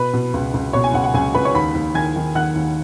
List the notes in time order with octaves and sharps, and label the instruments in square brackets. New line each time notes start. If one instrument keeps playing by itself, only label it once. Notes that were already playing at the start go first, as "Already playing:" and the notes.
Already playing: [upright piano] B2 B4 B5
B2
C#2
C#2
B2 C#5 C#6
G#5
C#2 F#5
F#5
C#2 G#5
C#2 B4 B5
C#5 C#6
D#2 B5 B6
D#2
D#3 G#5 G#6
D#3
D#3 F#5 F#6
D#2